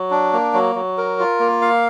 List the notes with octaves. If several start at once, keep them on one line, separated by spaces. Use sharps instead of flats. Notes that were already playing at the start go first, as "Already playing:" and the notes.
Already playing: F#3
D4
A#3
F#3
F#3
A#4
F4
A#3
F5